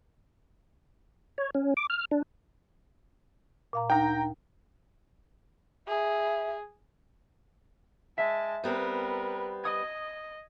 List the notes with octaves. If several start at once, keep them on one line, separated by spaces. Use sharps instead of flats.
C#5
C#4
D6
F6
D4
A#2 F5 A#5
D2 D#4 G5 A#5
G#4 E5
G#3 E5 A5
G3 B3 C4 A#4 B4
D#5 D#6 G#6